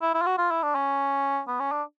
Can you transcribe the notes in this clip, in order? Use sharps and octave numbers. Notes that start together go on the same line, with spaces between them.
E4
E4
F4
F#4
F4
E4
D4
C#4
B3
C#4
D4